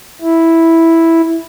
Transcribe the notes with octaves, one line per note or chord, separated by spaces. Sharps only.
E4